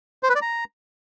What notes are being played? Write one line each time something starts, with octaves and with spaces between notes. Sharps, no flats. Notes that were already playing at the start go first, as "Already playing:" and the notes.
C5
B4
D5
A#5